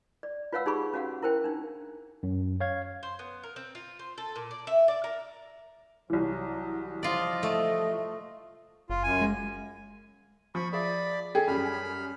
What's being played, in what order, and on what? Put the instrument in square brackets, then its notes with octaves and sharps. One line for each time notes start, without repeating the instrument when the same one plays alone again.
[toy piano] D5
F4 B4 C#5 F5 F#5 E6
D#4 G4 G#4 B5 C#6
C#4 F#4 F5 F#5
E4 A#4 C5 G5
D4 D#4
[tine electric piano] F#2
C#5 F5 G#6
[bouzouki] C5
B3
A#4
C4
F4
C5
A4
A#2
D5
E5
D5
A#4
[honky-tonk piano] C2 E3 [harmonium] F#3
[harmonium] F3 D#5 [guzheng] F4 D5
[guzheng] A3
[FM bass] F#1 [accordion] F4
[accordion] F#2 G#5
[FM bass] G#3
[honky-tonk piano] F3 [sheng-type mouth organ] B5 C#6
[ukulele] G#4 E5 F5 [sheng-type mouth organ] D5 B5
[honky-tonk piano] G#4 [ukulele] A4 G5
[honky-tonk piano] F#2 G3 [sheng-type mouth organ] B5 F6